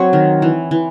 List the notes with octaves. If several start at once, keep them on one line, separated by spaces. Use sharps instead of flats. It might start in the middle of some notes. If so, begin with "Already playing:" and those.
Already playing: F#3 C4 C#5
D#3
E3
E3